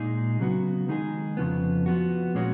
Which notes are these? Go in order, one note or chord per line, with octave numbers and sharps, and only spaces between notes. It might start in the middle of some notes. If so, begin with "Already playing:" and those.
Already playing: A#2 G#3 D#4 G#4
C#3 F#3 B3 F#4
D#3 G#3 D#4 G#4
F2 C#3 F3 B3
F3 B3 F#4
A#2 G#3 C#4 F#4